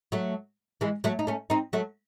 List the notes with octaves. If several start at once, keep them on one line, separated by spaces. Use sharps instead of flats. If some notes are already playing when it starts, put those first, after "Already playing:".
F#3 A3
E3 G#3
F#3 A3
D#4
A3 C#4
C4 D#4
F#3 A3